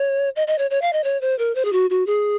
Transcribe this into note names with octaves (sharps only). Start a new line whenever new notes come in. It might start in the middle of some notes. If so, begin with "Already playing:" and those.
Already playing: C#5
D#5
D#5
C#5
C#5
F5
D#5
C#5
C5
A#4
C5
G#4
F#4
F#4
G#4